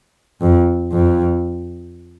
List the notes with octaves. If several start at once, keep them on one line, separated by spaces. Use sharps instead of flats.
F2
F2